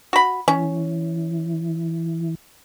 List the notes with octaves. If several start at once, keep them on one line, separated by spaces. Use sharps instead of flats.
F#4 B5
E3 C#4